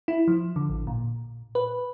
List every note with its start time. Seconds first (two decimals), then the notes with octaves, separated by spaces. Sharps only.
0.08 E4
0.28 F3
0.56 D3
0.69 A1
0.87 A#2
1.55 B4